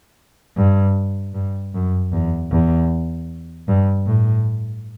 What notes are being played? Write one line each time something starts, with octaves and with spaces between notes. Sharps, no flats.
G2
G2
F#2
E2
E2
G2
A2